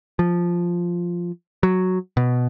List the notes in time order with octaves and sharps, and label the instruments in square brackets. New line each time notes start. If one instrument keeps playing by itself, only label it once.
[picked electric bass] F3
F#3
B2